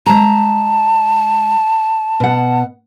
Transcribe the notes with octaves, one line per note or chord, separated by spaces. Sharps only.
G#3 A5 A#5
B2 F#5